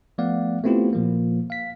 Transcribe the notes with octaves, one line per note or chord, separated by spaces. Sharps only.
F3 A3 B3 D5 F5 F#5
A3 B3 C4 E4 F4 G4
A#2 F3 A#3
F5 B6